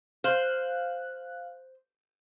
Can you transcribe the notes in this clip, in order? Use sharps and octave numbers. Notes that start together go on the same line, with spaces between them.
C5 F5 F#6